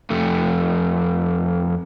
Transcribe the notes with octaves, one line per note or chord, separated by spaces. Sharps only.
F2 A3